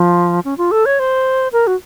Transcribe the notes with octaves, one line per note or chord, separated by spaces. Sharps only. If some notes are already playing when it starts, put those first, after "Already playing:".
Already playing: F3
C#4
F4
A4
C#5
C5
A#4
F#4